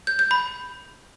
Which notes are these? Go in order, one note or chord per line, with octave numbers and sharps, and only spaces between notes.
G6
G6
B5